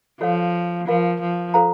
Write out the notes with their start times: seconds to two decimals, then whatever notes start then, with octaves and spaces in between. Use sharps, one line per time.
0.21 F3 F#4 A4 C#5 F5
0.87 F3 F4 A#4 F5
1.21 F3
1.54 F4 A4 C5 F5 A#5